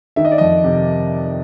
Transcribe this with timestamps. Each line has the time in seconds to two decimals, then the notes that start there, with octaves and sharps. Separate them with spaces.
0.16 D#3 E5
0.25 D#5
0.31 D5
0.38 F2 D#5
0.64 C3